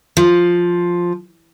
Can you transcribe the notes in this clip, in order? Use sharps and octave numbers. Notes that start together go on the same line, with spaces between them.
F3